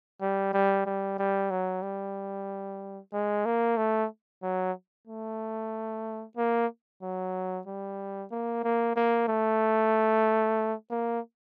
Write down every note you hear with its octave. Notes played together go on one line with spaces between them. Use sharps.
G3
G3
G3
G3
F#3
G3
G#3
A#3
A3
F#3
A3
A#3
F#3
G3
A#3
A#3
A#3
A3
A#3